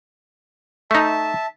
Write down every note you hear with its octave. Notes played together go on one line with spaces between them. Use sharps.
A3 D#4 E5 A5